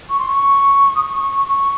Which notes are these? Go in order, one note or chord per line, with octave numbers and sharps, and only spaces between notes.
C#6
C6
C#6
D#6
C#6
C#6